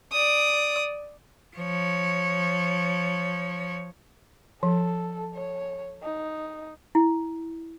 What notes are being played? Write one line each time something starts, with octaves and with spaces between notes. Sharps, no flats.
D5 D#6
F3 C#5
F3 A4
C#5
D#4
E4